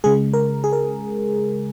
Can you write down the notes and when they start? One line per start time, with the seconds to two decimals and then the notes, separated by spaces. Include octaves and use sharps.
0.04 C#3 G#3 G#4
0.34 A#4
0.64 G#4
0.73 A#4